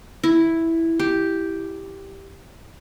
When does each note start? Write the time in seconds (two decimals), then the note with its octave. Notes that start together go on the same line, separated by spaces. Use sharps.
0.23 E4
0.99 G4